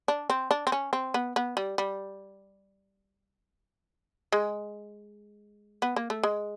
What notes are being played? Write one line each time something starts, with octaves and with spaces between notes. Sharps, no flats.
D4
C4
D4
C4
C#4
C4
B3
B3
G3
G3
G#3
B3
A#3
A3
G#3